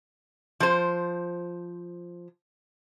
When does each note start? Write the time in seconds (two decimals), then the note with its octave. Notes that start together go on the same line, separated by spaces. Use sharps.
0.60 F3 C5